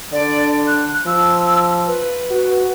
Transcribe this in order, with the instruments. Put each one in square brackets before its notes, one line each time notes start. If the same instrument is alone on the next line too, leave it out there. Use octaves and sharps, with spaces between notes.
[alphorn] D3 [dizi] D5
[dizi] F#6
[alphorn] F3 [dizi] E6
[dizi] B4
[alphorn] F#4